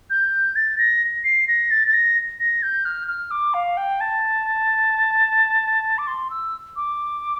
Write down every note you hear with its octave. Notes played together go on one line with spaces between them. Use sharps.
G6
A6
A#6
C7
A#6
A6
A6
A#6
A#6
G6
F6
F6
D6
F5
G5
A5
D6
C6
E6
D6